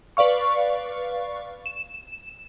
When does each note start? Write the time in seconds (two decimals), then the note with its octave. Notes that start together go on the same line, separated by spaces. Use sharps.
0.17 B4 D5 F5 C#6
1.66 E7